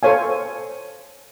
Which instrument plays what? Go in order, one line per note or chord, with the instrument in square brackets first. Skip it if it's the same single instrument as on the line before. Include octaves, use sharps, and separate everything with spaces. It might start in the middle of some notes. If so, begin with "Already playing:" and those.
[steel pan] A4 C5 C#5 F5 G#5